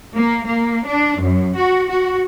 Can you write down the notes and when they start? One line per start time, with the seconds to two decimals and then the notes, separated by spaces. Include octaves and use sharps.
0.13 A#3
0.44 A#3
0.84 D4
1.18 F#2
1.55 F#4
1.87 F#4